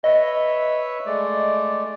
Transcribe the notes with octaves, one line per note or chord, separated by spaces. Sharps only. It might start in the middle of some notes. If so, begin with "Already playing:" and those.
B4 C#5 D#5 E5
G#3 A3 D5